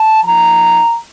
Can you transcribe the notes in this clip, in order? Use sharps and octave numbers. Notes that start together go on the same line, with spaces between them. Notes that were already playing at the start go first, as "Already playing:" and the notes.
Already playing: A5
F3 A#3 D#4 A#5